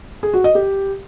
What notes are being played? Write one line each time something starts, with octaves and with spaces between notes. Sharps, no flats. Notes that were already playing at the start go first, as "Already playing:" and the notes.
G#4
F#4
D#5
G4